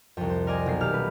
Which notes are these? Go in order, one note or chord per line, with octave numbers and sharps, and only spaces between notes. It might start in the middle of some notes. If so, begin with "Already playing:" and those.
C2 F2
C5
A#4 D5 D#5 G#5
B1 C7
D#1 G4 F6
B4